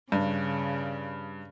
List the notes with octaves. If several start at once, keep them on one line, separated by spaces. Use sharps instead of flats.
G2 C#3